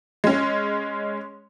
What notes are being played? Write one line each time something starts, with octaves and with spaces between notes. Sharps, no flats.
G#3 C#4